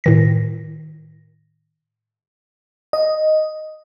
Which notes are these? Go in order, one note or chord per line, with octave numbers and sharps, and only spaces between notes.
A2 D#3 A#6
D#5